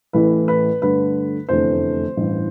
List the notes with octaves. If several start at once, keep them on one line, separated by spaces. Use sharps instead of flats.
A1 A2 E3 A3 B4
B4
G2 D3 A3 B4
F1 E2 D3 A3 C5
A1 G2 E3